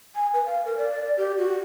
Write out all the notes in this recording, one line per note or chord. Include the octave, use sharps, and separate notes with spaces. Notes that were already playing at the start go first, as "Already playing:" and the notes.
G#5
B4
F5
A#4
D5
G4
F#4